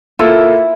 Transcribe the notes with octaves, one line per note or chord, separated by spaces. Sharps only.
A#3 E4 F4 A4